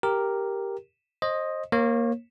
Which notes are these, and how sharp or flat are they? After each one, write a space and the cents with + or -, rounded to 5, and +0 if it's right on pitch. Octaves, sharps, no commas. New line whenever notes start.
G4 +0 A#4 +0
C5 +25 D#5 +0
A#3 +5 C#5 -35